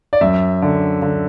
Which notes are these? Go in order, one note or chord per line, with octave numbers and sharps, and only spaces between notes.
D5
F#2 E5
D3
D3